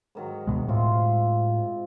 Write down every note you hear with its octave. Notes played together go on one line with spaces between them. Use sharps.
G#2 D#3 F#3
D2 B2 G#3
A2 C3 F4 C6